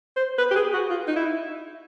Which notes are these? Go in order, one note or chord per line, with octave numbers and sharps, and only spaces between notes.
C5
B4
G4
G#4
F#4
F4
D#4
E4